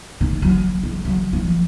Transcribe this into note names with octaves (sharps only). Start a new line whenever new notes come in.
D#3
F#3
G#3
F#3
F3